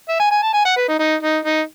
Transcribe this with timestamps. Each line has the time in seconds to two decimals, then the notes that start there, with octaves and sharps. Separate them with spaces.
0.09 E5
0.19 G#5
0.31 G#5
0.42 A5
0.53 G#5
0.65 F#5
0.77 B4
0.88 D#4
0.99 D#4
1.22 D#4
1.45 D#4